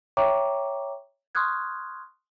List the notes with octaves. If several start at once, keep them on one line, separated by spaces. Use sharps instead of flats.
C#5 E5 G5 A#5 C#6 D6
C6 C#6 D#6 F6 F#6 G#6